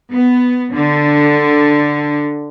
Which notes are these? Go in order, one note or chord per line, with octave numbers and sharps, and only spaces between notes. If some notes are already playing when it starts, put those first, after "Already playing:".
B3
D3